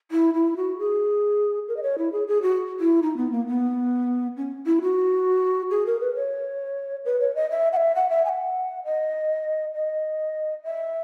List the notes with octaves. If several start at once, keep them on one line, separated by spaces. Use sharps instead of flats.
E4
E4
F#4
G#4
A#4
D#5
C#5
E4
G#4
G#4
F#4
E4
D#4
B3
A#3
B3
C#4
E4
F#4
G#4
A#4
B4
C#5
B4
C#5
D#5
E5
F#5
E5
F#5
E5
G#5
F#5
D#5
D#5
E5